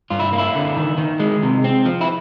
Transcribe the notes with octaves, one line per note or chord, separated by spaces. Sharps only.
G2 F4
E4
A#3
E4
D3
D#3
D#3
G#3
C3
C4
F3
E4